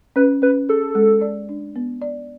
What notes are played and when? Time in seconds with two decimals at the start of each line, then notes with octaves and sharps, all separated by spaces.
0.16 C#4 B4
0.42 C#4 B4
0.69 G#4 A4
0.95 G#3
1.21 D5
1.49 D4
1.76 B3
2.02 D5